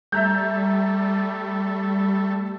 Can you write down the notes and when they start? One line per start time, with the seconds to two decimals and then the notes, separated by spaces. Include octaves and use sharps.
0.12 G3 A3 E5 A#5 G6